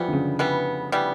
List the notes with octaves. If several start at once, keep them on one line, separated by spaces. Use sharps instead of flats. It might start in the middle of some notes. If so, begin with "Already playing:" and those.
Already playing: E3 F3 G3 B3
D3
C#3
E3 G3 B3
E3 G3 B3